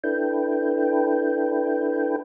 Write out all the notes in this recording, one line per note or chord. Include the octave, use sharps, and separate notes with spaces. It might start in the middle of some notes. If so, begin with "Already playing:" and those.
D4 E4 A4 B4 G5